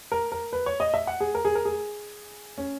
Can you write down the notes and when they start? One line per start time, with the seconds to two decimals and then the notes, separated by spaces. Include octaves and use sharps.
0.12 A#4
0.32 A#4
0.53 B4
0.66 C#5
0.80 D#5
0.94 E5
1.07 F#5
1.20 G#4
1.35 A#4
1.45 G#4
1.55 A#4
1.65 G#4
2.58 C#4